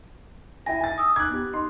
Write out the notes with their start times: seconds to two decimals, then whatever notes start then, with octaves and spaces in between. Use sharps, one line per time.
0.66 E4 G5 G#5 A#6
0.81 G#5 A6
0.98 D#6 E6
1.16 D6 F#6 G#6
1.29 B3 G4
1.53 D#4 C6